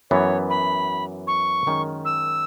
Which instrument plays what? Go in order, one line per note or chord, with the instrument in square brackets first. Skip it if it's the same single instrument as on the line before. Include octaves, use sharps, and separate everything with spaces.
[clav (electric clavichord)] F#2 E3 B3 [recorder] C#5
[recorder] B5
C#6
[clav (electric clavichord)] F#2 D#3 G#3 C#4
[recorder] E6